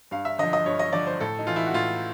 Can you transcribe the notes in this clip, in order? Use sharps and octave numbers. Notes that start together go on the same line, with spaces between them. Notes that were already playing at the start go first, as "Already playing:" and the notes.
G2 F5
E5
D3 F3 D#5
D#5
G2 C#5
D#5
D3 F3 D5
C5
A2 A4
D#4
E3 F4
E4
F#4
A2 F4